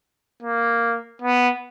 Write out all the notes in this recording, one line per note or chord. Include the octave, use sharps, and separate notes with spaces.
A#3
B3